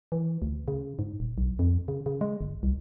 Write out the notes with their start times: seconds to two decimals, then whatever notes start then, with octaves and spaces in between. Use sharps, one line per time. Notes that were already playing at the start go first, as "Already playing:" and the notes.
0.12 E3
0.42 D2
0.68 C#3
0.99 G#2
1.20 D#1
1.38 B1
1.59 F2
1.88 C#3
2.06 C#3
2.21 G#3
2.41 G1
2.63 C2